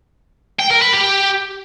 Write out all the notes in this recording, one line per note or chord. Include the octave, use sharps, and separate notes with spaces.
G5
A#4
B4
G4